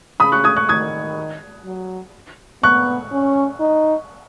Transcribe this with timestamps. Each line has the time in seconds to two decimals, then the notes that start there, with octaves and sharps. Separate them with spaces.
0.20 C#3 B5 D#6
0.32 C#6 F#6
0.44 D#6 G#6
0.56 C#6 F#6
0.69 D#3 D#6 G#6
1.65 F#3
2.63 B3 C#6 F#6
3.12 C#4
3.60 D#4